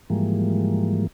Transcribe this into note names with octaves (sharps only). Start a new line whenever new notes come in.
G#2 E3 F3 G3 G#3 A#3